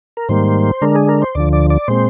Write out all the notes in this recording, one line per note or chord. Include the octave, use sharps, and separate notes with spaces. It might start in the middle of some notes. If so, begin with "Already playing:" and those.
A#4
G#2 D#3 G3 A#3 C5
D3 G#3 D4 A#4
G#4
A#4
C5
D2 D3 F3 D5
D5
D5
A#2 G#3 C4 C5